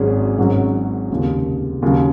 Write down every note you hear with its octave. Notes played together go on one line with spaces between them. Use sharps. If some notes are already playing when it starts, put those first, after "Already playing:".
Already playing: G#1 G#2 F#3 C#4 G#4
G#1 G#2 F#3 C#4 F#4
F1 D#2 C#3
D#2 C#3 F#3